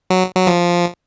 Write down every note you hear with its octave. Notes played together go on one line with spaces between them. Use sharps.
F#3
F#3
F3